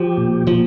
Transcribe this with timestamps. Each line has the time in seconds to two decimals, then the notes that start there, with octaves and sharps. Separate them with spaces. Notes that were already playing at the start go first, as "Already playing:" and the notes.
Already playing: F3 G4
0.17 A#2
0.47 A#2 F3